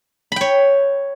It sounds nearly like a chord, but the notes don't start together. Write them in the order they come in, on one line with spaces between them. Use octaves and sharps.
B5 G5 C#5